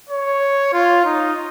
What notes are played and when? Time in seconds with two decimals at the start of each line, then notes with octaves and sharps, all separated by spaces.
0.10 C#5
0.73 F4
1.05 D#4